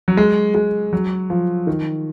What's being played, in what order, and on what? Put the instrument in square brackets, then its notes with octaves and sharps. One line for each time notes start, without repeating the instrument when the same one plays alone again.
[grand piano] F#3
G#3
G#3
F#3
F3
D#3